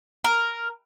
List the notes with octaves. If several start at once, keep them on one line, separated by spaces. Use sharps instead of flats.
A#4